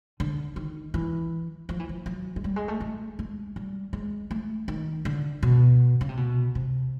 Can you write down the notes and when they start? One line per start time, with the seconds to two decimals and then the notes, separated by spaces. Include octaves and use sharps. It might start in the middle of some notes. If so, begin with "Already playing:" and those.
0.20 D3
0.56 D#3
0.94 E3
1.69 F3
1.80 E3
1.89 F3
2.06 F#3
2.36 G#3
2.44 G3
2.56 G#3
2.68 A3
2.80 A3
3.19 G#3
3.56 G3
3.93 G#3
4.31 A3
4.68 D#3
5.05 D3
5.43 B2
6.01 C#3
6.09 C3
6.17 B2
6.55 C3